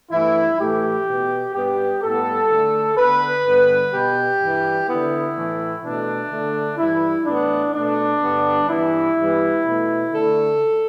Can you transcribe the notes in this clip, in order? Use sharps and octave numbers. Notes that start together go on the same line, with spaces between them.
G2 E3 A3 E4
A2 E3 A3 G4
B2 B3
G2 G3 B3 G4
A2 G3 B3 A4
D3 A3
D3 B3 B4
G2 D3 B3
B2 B3 G4
G2 E3 G3
D3 B3 E4
A2 E3 A3
B2 A3 D4
D3 A3
G2 E3 G3 E4
A2 E3 B3 D4
B2 A3 D4
G2 D3 G3 B3
G2 E3 B3 E4
G2 E3 G3 B3
B2 A3
D3 A3 A4